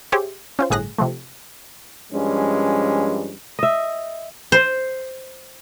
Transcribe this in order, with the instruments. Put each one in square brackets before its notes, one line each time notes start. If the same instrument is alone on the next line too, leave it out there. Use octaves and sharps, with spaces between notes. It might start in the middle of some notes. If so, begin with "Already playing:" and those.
[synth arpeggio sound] G4 G#4 C5 C#5 E5
C#4 F4 C5
G1 A2 G#4 F#6 A#6
C3 F3 A3
[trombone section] G2 F3 G#3 C#4
[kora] D#5 E5
[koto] C5